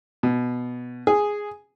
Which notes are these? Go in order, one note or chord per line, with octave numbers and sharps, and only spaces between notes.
B2
G#4